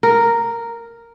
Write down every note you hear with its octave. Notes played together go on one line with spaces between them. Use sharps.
A#4